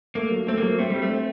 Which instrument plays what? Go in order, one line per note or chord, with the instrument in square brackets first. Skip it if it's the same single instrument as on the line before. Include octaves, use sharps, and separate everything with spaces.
[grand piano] A3 [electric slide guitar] A#3
[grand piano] F#3
[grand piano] A3 [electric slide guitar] C4
[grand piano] F#3 [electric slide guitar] A#3
[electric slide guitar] A3 [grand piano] C4
[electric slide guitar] G3 [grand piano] C4
[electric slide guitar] A3
[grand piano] C4